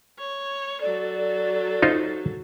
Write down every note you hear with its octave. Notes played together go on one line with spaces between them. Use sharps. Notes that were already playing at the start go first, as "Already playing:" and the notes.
C#5
F#3 A4 D5
D#4 F4 C5